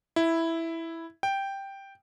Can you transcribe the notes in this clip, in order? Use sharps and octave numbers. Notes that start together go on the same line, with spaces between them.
E4
G5